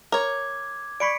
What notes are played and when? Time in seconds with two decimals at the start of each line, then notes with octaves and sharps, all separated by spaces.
0.12 A#4 C#5 D6 G#6
1.00 D5 B5 C#6 B6 C#7 D7